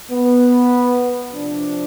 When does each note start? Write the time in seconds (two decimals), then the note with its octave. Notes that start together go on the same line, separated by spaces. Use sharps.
0.11 B3
1.32 C3 F3 D4